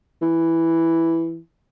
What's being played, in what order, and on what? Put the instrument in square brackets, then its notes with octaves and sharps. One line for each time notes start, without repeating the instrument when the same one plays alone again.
[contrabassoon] E3